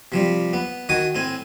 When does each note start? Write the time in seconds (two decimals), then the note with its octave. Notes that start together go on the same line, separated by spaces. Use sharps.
0.12 C3 F3 G3
0.53 B3
0.89 D#3 F#4 G#5 A5 D#6
1.15 A2 C4 G#5